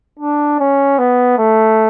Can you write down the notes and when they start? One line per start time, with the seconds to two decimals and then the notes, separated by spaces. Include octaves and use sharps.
0.19 D4
0.60 C#4
0.98 B3
1.38 A3